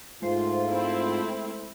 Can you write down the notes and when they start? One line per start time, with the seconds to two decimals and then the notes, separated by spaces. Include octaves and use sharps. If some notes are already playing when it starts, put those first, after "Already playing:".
0.22 G#2 G#3 A3 F4 C5
0.68 C4 E4